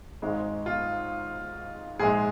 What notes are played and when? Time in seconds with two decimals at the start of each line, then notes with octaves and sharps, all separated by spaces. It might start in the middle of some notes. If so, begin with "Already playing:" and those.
0.22 G#1 G#2 G#3 D#4
0.66 F4
1.99 A#1 G#2 G#3 G#4